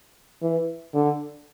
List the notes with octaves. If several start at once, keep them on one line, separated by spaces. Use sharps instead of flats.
E3
D3